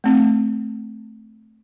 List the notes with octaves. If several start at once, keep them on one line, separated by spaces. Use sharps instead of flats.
A3 C4